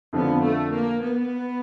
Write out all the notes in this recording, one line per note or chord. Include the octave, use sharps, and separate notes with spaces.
F2 D3 F3 B3
A3
A#3
B3